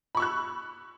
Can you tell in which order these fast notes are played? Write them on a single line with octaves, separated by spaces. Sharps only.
B5 C#6 E6 F#6